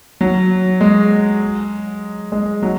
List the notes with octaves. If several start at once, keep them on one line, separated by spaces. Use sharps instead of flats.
F#3
G#3
G#3
F#3